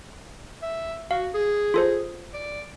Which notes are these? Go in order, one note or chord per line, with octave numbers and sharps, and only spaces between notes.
E5
F#4 F5
G#4
F4 A4 C5
D5